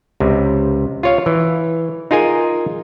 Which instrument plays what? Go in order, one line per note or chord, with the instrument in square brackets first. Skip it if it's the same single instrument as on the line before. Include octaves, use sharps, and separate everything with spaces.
[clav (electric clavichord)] C#2 C3
F4 C#5 F5
E3
D#4 F4 G#4 A#4 G#5